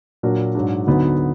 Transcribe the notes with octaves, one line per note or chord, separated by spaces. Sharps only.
A#2 F#3 D4 F#4 A#4
G#2 F#3 D4
D2 D3 F#3 B3 D#4